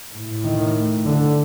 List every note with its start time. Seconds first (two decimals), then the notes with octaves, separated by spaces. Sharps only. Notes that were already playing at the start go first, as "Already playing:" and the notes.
0.13 A2
0.43 D#3
1.05 D3